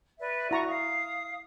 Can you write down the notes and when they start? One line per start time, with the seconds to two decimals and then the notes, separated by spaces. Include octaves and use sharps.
0.20 B4 D5 E5
0.51 E4 F#4 D5 A#5 C#6
0.68 F5 D#6